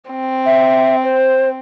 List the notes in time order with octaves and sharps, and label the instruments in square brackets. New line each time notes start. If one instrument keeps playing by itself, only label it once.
[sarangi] C4
[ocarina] E5
C5